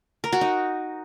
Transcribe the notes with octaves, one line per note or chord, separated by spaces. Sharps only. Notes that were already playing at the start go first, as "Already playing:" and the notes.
A#4
F#4
D#4